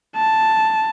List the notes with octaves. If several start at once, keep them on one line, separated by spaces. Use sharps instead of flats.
A5